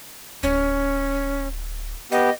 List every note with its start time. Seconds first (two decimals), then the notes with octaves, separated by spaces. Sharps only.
0.43 D1 C#4
2.12 B3 G4 D#5